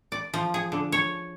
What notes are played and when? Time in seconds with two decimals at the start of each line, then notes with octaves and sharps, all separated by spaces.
0.12 D5
0.34 F3
0.54 G#4
0.72 D3
0.92 C#5